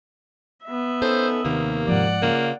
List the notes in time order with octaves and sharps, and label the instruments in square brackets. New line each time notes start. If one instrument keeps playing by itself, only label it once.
[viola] B3 E5
[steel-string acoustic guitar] C#4 D#4 A4 [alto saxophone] C5
[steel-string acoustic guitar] D#2 C3 D#3 [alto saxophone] A#3
[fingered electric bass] G#2 F3 [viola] D5 F#5
[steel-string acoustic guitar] C#3 F4 [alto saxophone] A#3